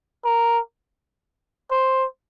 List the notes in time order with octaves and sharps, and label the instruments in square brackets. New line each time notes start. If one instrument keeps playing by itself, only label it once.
[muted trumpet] A#4
C5